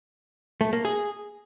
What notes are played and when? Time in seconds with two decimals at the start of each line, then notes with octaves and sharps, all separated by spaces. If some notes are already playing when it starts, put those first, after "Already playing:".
0.61 A3
0.73 A#3
0.85 G#4